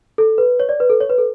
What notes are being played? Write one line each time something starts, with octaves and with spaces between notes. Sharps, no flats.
A4
B4
C#5
D5
B4
A4
C#5
B4
A4